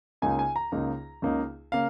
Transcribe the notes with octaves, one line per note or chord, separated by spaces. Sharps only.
C#2 C#3 A#3 D#4 G#5
G#5
A#5
C#2 C#3 A#3 D#4
C#2 C#3 A#3 D#4
C#3 A#3 F5